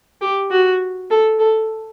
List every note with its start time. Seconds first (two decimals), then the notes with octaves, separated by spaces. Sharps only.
0.21 G4
0.51 F#4
1.10 A4
1.39 A4